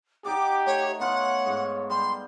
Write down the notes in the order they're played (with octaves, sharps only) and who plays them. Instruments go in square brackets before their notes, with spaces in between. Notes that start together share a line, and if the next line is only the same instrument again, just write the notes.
[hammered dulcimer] D#4 F#5 [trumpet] G4 [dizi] D6
[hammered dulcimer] A3 [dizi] C#5
[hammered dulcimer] B3 F4 [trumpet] C#5 [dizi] F#5
[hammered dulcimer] G#2
[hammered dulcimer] G3 [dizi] C6